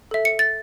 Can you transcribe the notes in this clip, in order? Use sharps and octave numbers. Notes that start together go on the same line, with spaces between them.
A4 E5
C#7
A6